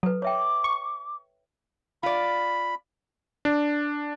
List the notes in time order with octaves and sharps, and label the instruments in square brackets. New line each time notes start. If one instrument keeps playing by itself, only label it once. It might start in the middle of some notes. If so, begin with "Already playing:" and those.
[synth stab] F#3 [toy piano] A4 B4
[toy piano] C#5 E5 G5 [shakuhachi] D6
[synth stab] C#6
[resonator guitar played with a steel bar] F4 D5 [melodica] B5
[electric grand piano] D4